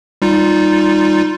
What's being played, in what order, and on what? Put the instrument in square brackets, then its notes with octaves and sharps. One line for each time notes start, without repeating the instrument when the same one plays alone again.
[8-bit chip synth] G3 D#4 F4